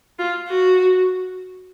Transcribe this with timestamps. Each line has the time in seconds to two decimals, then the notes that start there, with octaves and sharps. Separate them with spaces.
0.19 F4
0.47 F#4